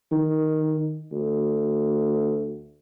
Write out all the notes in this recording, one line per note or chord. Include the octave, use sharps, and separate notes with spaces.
D#3
D2